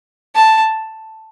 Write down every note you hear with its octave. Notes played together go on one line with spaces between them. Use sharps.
A5